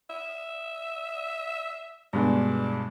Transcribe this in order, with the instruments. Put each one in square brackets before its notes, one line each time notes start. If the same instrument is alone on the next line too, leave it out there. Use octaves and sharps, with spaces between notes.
[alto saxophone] E5
[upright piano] G2 B2 G#3 [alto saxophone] D4